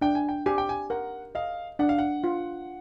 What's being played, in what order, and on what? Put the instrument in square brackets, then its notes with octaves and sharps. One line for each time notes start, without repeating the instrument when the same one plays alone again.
[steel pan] D4 [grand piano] G5
[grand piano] G#5
G5
[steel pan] G4 [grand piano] G#5
[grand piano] G5
G#5
[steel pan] A#4 [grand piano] F#5
[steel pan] D#5 [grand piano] F5
[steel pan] D4 [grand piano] F#5
[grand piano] F5
F#5
[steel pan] F4